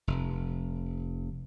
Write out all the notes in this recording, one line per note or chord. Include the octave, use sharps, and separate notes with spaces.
F1